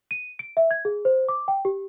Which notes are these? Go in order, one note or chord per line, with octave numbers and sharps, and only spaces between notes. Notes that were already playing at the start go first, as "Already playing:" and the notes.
D#7
D7
E5
G#6
G#4
C5
D6
G5
G4